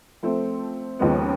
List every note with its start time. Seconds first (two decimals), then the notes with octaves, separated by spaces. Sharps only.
0.23 F3 A3 C4
0.99 D#2 C#3 F3 G#3 B3